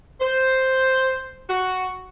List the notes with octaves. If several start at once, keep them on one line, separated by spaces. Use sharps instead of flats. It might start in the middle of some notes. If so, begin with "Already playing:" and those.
C5
F#4